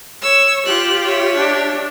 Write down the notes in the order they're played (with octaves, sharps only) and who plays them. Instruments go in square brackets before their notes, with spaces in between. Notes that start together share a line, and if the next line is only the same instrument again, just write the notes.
[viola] C#5 [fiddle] E6
[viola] F4 G4 [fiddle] F#6
[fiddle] C#5 E5
[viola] D4 G4